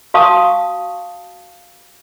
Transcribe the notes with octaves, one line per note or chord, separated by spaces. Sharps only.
F#4 F5 A5 C#6 D#6